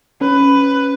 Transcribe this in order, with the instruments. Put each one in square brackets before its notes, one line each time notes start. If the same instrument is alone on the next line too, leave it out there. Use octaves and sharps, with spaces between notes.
[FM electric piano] C#4 [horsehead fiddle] B4